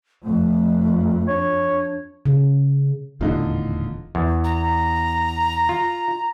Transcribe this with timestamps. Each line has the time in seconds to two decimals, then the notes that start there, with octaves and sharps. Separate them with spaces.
0.24 F2 A3
1.28 D4 C#5
2.26 C#3
3.21 D#1 E2 A2 D3 D#4 F4
4.15 E2
4.44 A#5
5.69 F4